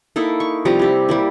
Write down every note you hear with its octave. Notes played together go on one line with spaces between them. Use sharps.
A#3 D#4 E4 A4
C#6
C3 F3 G3 A#5
E4 G4
G3 A#3 E4